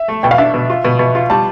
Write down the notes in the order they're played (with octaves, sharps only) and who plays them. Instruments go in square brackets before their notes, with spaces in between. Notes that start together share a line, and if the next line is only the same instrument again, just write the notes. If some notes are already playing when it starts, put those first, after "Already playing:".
Already playing: [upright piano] E5
[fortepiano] A3
[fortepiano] B2 [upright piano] G5
[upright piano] F5
[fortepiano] D4 [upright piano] E5
[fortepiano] B2
F4
B2
B2
F4
[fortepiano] G3 [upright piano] A5